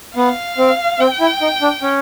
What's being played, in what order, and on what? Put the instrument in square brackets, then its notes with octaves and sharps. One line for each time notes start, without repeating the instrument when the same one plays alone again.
[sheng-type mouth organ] B3 [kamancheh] F5
[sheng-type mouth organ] C4
[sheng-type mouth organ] C4 [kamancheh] G5
[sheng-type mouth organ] E4
D#4
D4
C#4